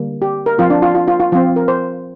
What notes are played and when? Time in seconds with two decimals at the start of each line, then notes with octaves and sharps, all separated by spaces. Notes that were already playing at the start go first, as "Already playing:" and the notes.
Already playing: D3 G3 A#3
0.22 G4
0.46 A#4
0.58 F3 C4 F4
0.70 D4
0.82 F4
0.95 F4
1.08 F4
1.20 F4
1.32 F3 F4
1.35 C4
1.56 A#4
1.68 C5